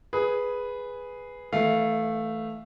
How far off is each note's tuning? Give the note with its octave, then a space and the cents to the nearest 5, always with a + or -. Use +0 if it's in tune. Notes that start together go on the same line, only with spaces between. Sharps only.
G#4 +0 B4 +0
E3 -20 A3 +0 F5 +0